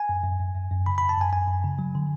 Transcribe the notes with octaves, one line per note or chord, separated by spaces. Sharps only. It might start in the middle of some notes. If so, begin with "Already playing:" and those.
Already playing: G#5
F#2
F#2
F#2
F#2
F#2
C#3 B5
F#2 B5
A5
F#2 G#5
F#2 G#5
F#2
C#3
F#3
D3